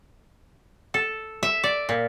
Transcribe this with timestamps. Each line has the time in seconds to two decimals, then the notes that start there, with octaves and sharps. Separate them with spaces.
0.94 A4
1.43 E5
1.64 D5
1.89 A#2